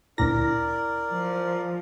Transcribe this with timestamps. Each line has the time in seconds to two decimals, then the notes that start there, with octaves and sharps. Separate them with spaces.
0.18 D2 A#2 E4 A#4 D5 A#6
1.10 F3